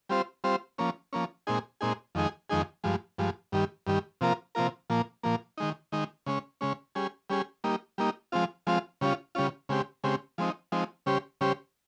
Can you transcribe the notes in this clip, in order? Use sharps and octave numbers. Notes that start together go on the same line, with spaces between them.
G3 C4 F4 C5
G3 C4 F4 C5
F3 A#3 C#4
F3 A#3 C#4
A#2 G#3 C4 D#4 G#4
A#2 G#3 C4 D#4 G#4
F2 D#3 G#3 D#4 G#4
F2 D#3 G#3 D#4 G#4
G2 F3 G#3
G2 F3 G#3
G2 D#3 G3
G2 D#3 G3
C3 F3 A#3 F4 A#4
C3 F3 A#3 F4 A#4
A#2 F3 A#3
A#2 F3 A#3
D#3 G#3 D#4
D#3 G#3 D#4
C#3 G#3 C#4
C#3 G#3 C#4
G3 C#4 G#4
G3 C#4 G#4
G3 A#3 D#4
G3 A#3 D#4
F3 G#3 C4 F4
F3 G#3 C4 F4
C#3 G3 C#4 F4
C#3 G3 C#4 F4
C#3 G#3 C4 G4
C#3 G#3 C4 G4
F3 G#3 C4 D#4
F3 G#3 C4 D#4
C#3 G3 C#4 G4 C5
C#3 G3 C#4 G4 C5